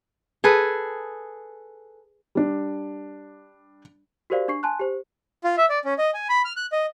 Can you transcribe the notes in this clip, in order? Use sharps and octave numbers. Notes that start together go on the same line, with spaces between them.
G#4 A4 B4
G3 D4
F#4 G4 A#4 C5 D5 F5
D4 C#6 C7
G#5 A5 C6 F#6
G4 C5
F4
E5
D5
C#4
D#5
G#5
B5
F6
F#6
D#5